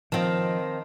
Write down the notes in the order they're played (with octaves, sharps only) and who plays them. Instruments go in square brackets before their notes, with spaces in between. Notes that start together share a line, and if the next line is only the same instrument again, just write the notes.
[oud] D#3 C4 [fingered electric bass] F3 [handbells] D#5 F5 A5